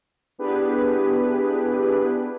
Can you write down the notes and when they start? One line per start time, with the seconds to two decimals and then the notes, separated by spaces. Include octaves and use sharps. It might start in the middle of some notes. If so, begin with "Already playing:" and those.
0.38 B3 D4 E4 G4 G#4 B4